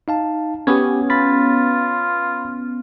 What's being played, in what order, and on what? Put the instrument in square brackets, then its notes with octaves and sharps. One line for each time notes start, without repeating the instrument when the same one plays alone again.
[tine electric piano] D#4 F5 A5
[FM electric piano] B3 C#4 [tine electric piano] G4 D#6 G#6
[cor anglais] F4 [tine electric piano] B5 A6 B6